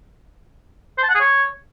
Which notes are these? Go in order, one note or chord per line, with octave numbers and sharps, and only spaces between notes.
C5
A5
F#5
G#4
C#5